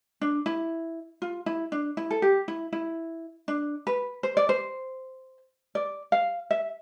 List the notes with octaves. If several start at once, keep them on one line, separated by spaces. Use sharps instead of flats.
D4
E4
F4
E4
D4
E4
A4
G4
E4
E4
D4
B4
C5
D5
C5
D5
F5
E5